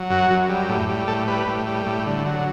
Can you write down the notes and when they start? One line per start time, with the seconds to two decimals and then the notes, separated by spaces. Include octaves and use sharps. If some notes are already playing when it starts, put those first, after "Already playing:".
Already playing: F#3
0.10 F#2 F#4
0.31 F#2
0.49 G3
0.69 A2
0.89 G3
1.08 A2 A4
1.28 G3 B4
1.47 A2
1.67 G3
1.86 A2
2.06 D3
2.25 F#3